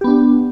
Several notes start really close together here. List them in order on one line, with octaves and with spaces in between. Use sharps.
G4 B3 D4